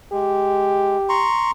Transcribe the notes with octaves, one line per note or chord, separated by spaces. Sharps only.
G#3 G4
A#5 C6 C#6